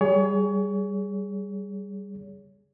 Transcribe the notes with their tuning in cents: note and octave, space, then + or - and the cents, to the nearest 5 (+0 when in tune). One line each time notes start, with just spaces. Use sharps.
G3 -5 G#4 +0 C#5 +35